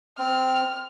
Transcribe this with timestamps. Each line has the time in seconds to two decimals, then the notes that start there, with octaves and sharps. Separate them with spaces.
0.18 C4 F6